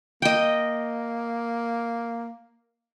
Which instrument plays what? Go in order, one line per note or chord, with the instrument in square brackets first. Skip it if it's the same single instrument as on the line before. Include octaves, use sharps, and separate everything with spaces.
[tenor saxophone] A#3 [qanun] D#5 G5